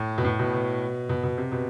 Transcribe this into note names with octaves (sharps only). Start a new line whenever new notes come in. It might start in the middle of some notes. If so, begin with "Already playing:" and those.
Already playing: A2
B2
A2
B2
B2
B2
B2
C3
B2